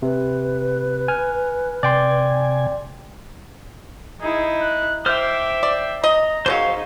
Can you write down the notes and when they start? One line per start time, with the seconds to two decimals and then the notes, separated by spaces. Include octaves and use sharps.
0.02 C3 B4
1.08 G#5 F6
1.83 C3 D5 G5 G#5 C6
4.21 D#4 E4 G#4
4.61 F#6
5.06 C5 E5 G5 D6 F6
5.63 D5
6.04 D#5 A#5
6.46 D#3 F#3 C#4 D#4 G#4 C5 F5